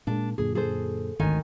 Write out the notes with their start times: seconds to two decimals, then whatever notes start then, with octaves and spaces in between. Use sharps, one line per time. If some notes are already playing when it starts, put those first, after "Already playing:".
0.07 A#2 G#3 A#3 D4
0.38 F#2 A#2 D3 G#4
0.55 G#4 A4 C5
1.20 G#1 D2 D#3 C#5 G#5